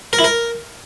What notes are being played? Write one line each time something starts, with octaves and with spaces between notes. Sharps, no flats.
A#4
E4
A#4